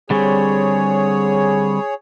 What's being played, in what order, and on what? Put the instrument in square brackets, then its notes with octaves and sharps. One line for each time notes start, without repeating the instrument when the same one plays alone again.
[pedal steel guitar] D3 G3 C4 [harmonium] G#4 C#5